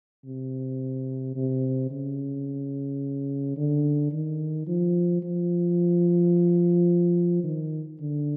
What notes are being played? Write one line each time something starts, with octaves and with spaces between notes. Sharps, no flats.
C3
C3
C#3
D3
D#3
F3
F3
D#3
D3